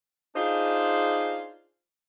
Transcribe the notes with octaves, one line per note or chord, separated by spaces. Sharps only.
D4 D#4 F4 G#4 C5